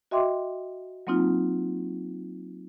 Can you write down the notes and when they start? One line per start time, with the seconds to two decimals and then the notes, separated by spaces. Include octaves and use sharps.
0.11 F#4 D#5 E5 G5 C6 D6
1.07 F#3 A#3 C4 D#4 F4